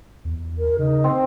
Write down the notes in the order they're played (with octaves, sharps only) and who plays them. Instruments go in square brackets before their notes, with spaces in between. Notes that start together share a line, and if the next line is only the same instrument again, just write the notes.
[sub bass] E2
[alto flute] A#4
[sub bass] C#3 [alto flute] D#4
[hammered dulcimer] C4